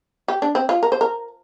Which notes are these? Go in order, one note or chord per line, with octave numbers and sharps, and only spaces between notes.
G4
D4
C4
F4
A#4
C5
A#4